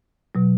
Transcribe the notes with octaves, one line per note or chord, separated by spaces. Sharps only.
B2 F#3